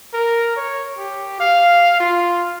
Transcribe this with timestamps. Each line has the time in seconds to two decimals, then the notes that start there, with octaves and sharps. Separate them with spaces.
0.14 A#4
0.57 C#5
0.98 G4
1.40 F5
2.00 F4